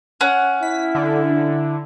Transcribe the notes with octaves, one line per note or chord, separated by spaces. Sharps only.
C#4 F#5
E4 B6
D3